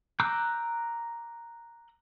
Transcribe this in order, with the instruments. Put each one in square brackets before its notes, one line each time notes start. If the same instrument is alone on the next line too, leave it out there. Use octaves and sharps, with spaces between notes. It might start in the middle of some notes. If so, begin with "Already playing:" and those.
[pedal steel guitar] A#5 D6 E6 F#6 G6